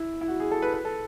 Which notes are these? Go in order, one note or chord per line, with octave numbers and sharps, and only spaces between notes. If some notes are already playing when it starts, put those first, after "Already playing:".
Already playing: E4
E4
F#4
G#4
A4
B4
B4
A4